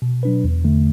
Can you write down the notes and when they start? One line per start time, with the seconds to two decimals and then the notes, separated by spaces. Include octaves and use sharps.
0.02 B2
0.23 F#3 D4 B4
0.44 E2
0.64 D3 A3